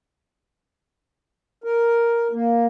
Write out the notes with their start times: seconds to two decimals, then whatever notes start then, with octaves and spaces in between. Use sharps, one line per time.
1.64 A#4
2.31 A#3